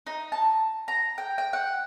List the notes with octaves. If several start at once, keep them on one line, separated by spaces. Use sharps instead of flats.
D#4
A5
A#5
G5
G5
F#5